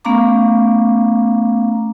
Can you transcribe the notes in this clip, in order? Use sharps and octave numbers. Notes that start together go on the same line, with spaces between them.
A3 B3 C#4 F5 A#5 D6